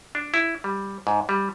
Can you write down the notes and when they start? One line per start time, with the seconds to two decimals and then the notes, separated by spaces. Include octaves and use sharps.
0.15 D4
0.34 E4
0.64 G3
1.07 G#2
1.29 G3